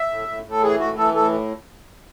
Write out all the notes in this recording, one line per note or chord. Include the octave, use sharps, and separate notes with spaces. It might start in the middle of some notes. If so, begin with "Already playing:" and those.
Already playing: E5
A2
A2
A2 A4
E3 G#4
A2 F#4
E3 A4
A2 A4